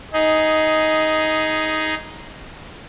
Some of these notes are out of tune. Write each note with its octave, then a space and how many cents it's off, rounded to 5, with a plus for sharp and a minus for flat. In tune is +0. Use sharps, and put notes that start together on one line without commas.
D#4 +10 G#4 +0